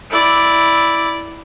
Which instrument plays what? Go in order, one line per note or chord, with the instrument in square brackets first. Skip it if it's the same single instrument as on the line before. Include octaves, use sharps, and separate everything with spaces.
[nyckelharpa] E4 D5